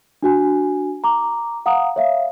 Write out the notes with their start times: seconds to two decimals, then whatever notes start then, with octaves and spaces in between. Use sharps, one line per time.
0.23 D4 F#4 G#5
1.04 A#5 D6
1.66 F5 F#5 A#5 D#6
1.96 C#5 E5 F5